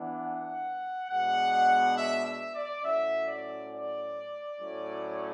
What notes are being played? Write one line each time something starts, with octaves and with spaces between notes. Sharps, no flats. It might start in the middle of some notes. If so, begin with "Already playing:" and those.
Already playing: E3 B3 D4
F#5
B2 G#3 B3 D4 F#5
E5
E5
D5
A2 F#3 C#4 E5
D5
D5
A2 F#3 C#4